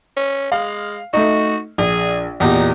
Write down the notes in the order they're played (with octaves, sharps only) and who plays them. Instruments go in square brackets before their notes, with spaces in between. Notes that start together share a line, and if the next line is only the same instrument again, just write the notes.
[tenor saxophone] C#4
[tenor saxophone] G#3 [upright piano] F5
[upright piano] A3 D#4 [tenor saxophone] F#4
[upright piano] A#1 [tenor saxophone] G#4
[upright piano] E2 A#2 G4 [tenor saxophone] D#4